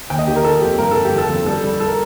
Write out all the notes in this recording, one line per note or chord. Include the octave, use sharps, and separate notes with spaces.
D#2 G5
D#5
D#3 G4
A#4
D#3 A4
F2 G4
G2 A#4
G2 A4
G4
F1
A4
F2
G3 A4
G3
A4
A#4